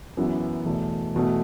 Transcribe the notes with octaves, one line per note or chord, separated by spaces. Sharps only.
F#2 E3 B3 F#4
E2 B2 A3
E2 B2 A3